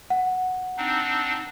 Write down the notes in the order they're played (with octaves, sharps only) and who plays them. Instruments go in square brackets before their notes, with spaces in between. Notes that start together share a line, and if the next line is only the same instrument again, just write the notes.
[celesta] F#5
[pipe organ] C4 D4 D#4